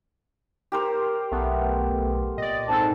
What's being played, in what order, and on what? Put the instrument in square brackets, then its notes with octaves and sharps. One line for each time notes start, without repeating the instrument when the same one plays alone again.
[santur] G4 A#4 C5
[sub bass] B1 [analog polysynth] A3 B3
[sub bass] B1
[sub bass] A#2 [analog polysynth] D5 D#5
[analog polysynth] G#2 C4 A4 [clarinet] A5